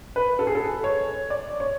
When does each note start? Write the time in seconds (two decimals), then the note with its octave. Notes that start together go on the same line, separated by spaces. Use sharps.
0.16 B4
0.39 A4
0.47 G#4
0.55 A4
0.84 C#5
1.30 D5
1.60 C#5